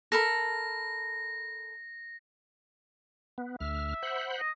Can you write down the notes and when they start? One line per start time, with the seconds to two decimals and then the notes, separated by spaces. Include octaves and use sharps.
0.12 A4 A#4 B5 A#6
3.38 B3
3.60 D2 E5 F6
4.03 C5 F#5 B5
4.39 D#5